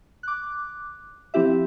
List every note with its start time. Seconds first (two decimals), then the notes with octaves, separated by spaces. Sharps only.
0.23 D6 F#6
1.34 F3 C4 E4 G4 E5